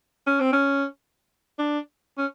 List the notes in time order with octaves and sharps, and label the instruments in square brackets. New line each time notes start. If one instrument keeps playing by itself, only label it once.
[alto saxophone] C#4
C4
C#4
D4
C#4